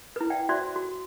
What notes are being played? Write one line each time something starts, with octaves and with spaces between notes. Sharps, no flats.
E4 B4
D5 E5 F#5 G5
F#4 C5 D5 E5 C6
F#4